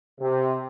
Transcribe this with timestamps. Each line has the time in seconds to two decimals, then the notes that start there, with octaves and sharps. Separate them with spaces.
0.21 C3